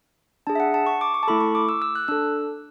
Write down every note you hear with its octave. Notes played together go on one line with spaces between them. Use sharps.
D4 G#4 A5
E5
F#5
A5
C#6
D6
C#6
A5
A3 E4 A4 B5
C#6
D6
E6
E6
F#6
D4 A4 E6